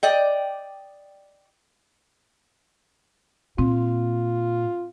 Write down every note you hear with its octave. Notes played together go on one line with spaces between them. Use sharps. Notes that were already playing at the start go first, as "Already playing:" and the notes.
D5 D#5 G5
A#2 C4 F4